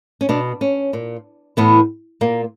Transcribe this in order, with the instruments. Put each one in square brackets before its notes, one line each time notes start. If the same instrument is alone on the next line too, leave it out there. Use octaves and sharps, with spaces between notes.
[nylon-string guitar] C#4
B2 D4
C#4
A#2
A2 E3 B3
A#2 A#3